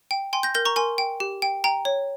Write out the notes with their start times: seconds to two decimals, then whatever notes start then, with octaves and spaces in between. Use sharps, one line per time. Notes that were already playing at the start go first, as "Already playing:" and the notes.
0.11 G5
0.33 G5 G#5 C6
0.43 G6 A#6
0.55 A#4 G6 A#6
0.65 A#5 C#6
0.76 A#4 G#5 C6
0.98 G5
1.20 G4
1.42 G5
1.64 G5 A#5
1.85 C#5